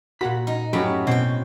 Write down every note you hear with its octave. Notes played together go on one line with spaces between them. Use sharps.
A#2 F#4 F#5 B5
D#4
F#2 A2 F#3 C#4 G4 B5
B2 C4 G5